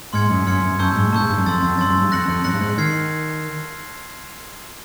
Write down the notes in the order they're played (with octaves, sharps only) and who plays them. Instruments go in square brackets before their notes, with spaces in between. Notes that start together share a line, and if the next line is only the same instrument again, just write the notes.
[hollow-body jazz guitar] G#2 [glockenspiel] C6 F6 G#6 C#7
[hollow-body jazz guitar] F#2
[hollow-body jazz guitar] F#2 [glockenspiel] C6 F6 G#6 C#7
[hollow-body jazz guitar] F#2
[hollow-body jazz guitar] F#2 [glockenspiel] A5 C#6 E6 G6
[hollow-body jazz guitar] G#2
G#2
[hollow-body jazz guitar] A2 [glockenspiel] A5 C#6 E6 G6
[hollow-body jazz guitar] G#2
G2
F#2
[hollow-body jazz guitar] F2 [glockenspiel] C6 E6 A6
[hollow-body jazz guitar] F2
[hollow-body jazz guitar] F#2 [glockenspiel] C6 E6 A6
[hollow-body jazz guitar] F#2
G2
[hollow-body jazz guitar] F2 [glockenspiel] F#6 A#6 C#7 F#7
[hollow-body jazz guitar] F2
[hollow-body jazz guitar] F#2 [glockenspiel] F#6 A#6 C#7 F#7
[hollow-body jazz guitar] G2
G#2
[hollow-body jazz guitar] D#3 [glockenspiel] F6 G#6 C7